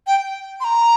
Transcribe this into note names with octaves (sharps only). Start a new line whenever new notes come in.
G5
C6
A#5